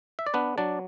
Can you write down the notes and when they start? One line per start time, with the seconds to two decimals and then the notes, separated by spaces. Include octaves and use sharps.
0.19 E5
0.27 D5
0.34 B3 D4 B4
0.58 F#3 D4 D5